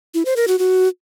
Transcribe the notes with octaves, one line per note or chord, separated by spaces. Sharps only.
E4
C5
A#4
F#4
F#4